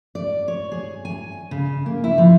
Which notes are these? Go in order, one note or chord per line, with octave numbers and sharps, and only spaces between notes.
D5
C#5
G#4
G#5
C#3
A#3
E4
F3